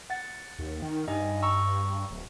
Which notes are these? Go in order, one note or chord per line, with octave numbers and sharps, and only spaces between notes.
F#5 A6
D#2
D#3
G2 D#4 D#5 G#5
A#5 C#6 E6
D1